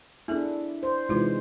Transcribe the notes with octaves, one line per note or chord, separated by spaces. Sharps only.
B3 D4 E4 G#4 A4
C5
C3 E3 G#3 D#4 F4 B4